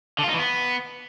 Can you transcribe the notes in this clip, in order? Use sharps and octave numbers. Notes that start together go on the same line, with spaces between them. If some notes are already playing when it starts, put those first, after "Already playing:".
D3
F4
D#4
E3
B3